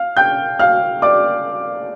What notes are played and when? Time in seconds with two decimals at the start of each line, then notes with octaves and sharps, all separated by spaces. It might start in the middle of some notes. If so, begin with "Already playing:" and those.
Already playing: F5 F6
0.17 G5 G6
0.59 F5 F6
1.02 D5 D6